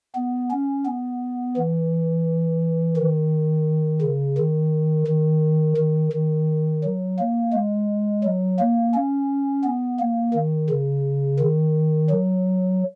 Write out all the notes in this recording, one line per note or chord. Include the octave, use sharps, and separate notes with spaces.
B3
C#4
B3
E3
D#3
C#3
D#3
D#3
D#3
D#3
F#3
A#3
G#3
F#3
A#3
C#4
B3
A#3
D#3
C#3
D#3
F#3